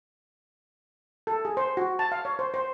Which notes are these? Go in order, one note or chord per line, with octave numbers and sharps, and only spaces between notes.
A4
G#4
C5
F#4
A5
F5
C#5
C5
C5